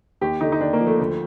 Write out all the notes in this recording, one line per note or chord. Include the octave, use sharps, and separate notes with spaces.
D#2 G4
D3 D#4
D#4
D#2 D4
A#3
F3
A3
D2